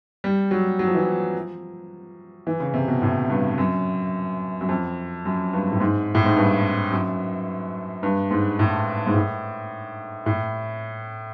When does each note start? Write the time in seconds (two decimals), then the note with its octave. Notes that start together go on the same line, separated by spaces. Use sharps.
0.24 G3
0.51 F#3
0.79 F#3
0.87 F3
0.95 E3
1.03 F3
2.47 E3
2.60 C#3
2.74 C3
2.88 B2
3.02 A2
3.30 G2
3.58 F#2
4.61 F#2
4.69 F2
5.25 F#2
5.53 G2
5.72 A2
5.80 G#2
6.15 A2
6.25 G#2
6.37 G2
6.92 F#2
8.03 G2
8.31 G#2
8.59 A2
9.06 G#2
9.14 A2
10.26 A2